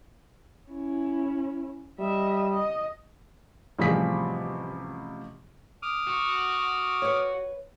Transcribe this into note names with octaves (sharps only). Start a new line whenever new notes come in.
C#4 E4
G3 D#5 E5
D#5
A1 C3 F3 G3 G#4 B6
D6 D#6 F6
F#4
B4 C#5